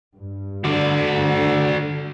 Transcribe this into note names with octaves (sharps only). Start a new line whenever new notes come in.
G2
D3 F#4 D5